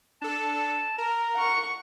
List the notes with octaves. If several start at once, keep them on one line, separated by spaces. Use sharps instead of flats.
D4 A4 A5
A#4 A#5
F#5 C#6